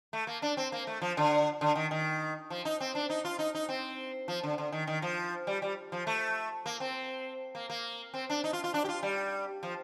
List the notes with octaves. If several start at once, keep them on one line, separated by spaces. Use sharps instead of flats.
A3
A#3
D4
C4
A#3
A3
F3
D3
D3
D#3
D#3
F3
D#4
C4
D4
D#4
F4
D#4
D#4
C4
F3
D3
D3
D#3
D#3
F3
G3
G3
F3
A3
A#3
C4
A#3
A#3
C4
D4
D#4
F4
F4
D4
G4
F4
G3
F3